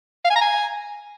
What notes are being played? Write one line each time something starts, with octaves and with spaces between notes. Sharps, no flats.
F5
G#5
A#5
G#5